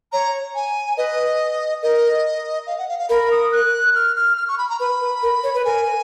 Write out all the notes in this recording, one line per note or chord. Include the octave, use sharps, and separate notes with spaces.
C#5 A#5
G#5
B4 D#5
A#4 D#5
F5
F#5
F5
F5
A#4 B5
D#6
F#6
F6
F6
F6
C#6
B5
A#5
B4 B5
B4
A#4
C#5
B4
A#4 G#5